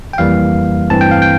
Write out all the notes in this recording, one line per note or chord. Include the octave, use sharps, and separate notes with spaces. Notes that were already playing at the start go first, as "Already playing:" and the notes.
G5
F2 E3 G3 A#3 F5
G2 E3 A3 C4 A5
G5
F5
G5